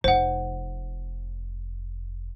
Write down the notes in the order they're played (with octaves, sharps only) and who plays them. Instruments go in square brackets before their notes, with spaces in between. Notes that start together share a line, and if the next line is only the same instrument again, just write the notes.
[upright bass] F1 D#4 [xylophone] C5 F#5